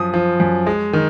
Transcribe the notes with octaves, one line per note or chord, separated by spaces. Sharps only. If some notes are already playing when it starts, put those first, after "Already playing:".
Already playing: F#2 F3 D#6
F3
F#2
G#3
D#3